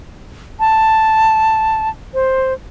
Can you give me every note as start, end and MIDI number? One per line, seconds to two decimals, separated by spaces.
0.60 1.89 81
2.14 2.53 72